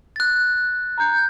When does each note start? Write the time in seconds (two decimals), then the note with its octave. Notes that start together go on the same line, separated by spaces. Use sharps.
0.16 F#6 A6
0.98 A#5 G6